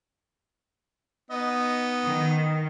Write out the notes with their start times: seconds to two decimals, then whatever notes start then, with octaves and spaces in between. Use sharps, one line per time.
1.31 B3 D#4 D#5
2.07 D#3